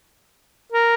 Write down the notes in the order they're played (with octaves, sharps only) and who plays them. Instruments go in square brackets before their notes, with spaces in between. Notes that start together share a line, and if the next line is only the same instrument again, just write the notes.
[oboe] A#4